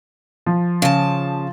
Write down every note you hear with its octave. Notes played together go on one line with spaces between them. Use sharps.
F3
C#3 A5